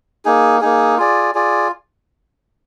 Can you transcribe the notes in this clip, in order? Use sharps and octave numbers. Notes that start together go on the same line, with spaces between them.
A#3 D#4 G#4
A#3 D#4 G#4
F4 G#4 D5
F4 G#4 D5